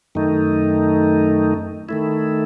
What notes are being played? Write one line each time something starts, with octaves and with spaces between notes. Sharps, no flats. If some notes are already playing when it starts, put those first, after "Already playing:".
F#2 D#3 A3 D#4
D#3 A3 E4